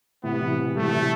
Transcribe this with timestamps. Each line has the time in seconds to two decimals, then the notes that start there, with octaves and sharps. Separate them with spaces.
0.23 A2 C3 B3
0.41 C3 E3
0.59 E3 G3
0.76 E3 G3 A3
0.94 C3 E3